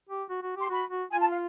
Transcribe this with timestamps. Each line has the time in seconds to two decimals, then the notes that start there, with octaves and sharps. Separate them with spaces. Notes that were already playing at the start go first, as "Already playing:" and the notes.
0.09 G4
0.30 F#4
0.43 F#4
0.57 G4 C6
0.70 F#4 B5
0.90 F#4
1.11 F4 G#5
1.21 A5
1.31 F5